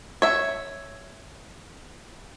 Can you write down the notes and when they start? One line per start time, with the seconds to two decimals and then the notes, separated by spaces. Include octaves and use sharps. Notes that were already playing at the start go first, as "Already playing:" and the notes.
0.22 C#5 E5